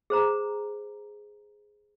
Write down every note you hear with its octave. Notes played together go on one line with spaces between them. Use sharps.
G#4 C5 A#5